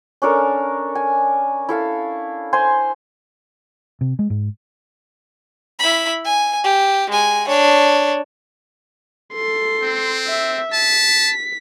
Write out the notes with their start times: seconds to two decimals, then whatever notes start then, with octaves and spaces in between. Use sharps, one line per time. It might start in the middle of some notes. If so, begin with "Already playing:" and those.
0.22 C#4 D4 A4 A#4
0.95 G#5
1.69 E4 A4 F5
2.53 C5 G#5 C6
4.01 C3
4.19 G#3
4.30 G#2
5.79 E4 B5
6.25 G#5
6.64 G4
7.09 G#3 G#5
7.48 D4 C#5
9.33 A4 C6
9.83 C4
10.27 E5
10.73 A5 B6